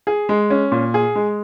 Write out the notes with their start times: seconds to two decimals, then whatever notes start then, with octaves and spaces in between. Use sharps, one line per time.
0.07 G#4
0.29 G#3
0.50 C#4
0.72 A#2
0.94 G#4
1.15 G#3